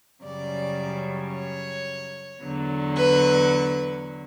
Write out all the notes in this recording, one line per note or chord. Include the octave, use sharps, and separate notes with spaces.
F#2 C#3 G3 D5
C#5
E2 D3 F#3
B4